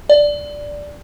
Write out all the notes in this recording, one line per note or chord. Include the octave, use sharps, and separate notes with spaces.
D5